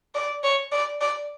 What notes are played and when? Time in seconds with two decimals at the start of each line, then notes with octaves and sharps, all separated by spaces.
0.14 D5
0.43 C#5
0.72 D5
1.01 D5